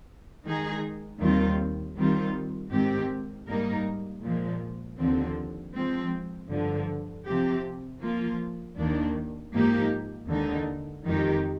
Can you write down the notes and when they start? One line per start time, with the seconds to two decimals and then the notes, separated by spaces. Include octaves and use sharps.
0.44 D#3 G#3 D#4 G#4
1.20 D#2 D#3 G3 C4 F4
1.96 D#3 G3 C4 F4
2.71 G#2 D#3 G#3 C4 G4
3.47 G#2 G3 A#3 D#4 A#4
4.23 A#2 F3 G#3
4.98 D#2 D3 F3 C4
5.74 F3 G#3 C4
6.50 G2 D3 F3
7.26 C3 F3 C4 G4
8.01 F3 A#3 F4
8.77 D#2 D#3 A#3 D4
9.53 G#2 F3 A#3 D#4 G4
10.28 D#2 D3 G#3 D#4
11.04 F2 D#3 G#3 D#4 G4